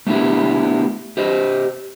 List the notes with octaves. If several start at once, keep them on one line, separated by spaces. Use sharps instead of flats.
A3 B3 D4 E4 G4
G4 C5 D#5